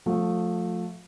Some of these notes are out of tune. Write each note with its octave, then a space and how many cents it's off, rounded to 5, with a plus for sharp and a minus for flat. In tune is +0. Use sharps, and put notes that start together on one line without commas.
F3 +25 A3 +0